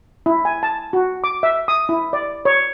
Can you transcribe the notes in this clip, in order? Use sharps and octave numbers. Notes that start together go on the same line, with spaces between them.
E4
G#5
A5
F#4
D6
E5
D#6
E4
D5
C#5